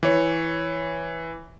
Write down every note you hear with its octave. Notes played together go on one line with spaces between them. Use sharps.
E3 C#5